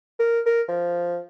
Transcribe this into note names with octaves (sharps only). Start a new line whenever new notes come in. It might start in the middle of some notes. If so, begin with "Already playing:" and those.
A#4
A#4
F3